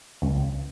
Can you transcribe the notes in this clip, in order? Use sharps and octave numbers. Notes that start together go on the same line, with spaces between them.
C#2